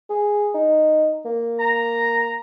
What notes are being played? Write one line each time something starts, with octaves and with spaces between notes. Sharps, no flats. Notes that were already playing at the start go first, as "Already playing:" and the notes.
G#4
D#4
A#3
A#5